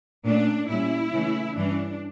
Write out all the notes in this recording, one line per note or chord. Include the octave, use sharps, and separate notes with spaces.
A#2 A3 C#4 D4
A#2 G3 C#4 E4
C#3 E3 A3 C#4
G2 E3 G3 C#4 D4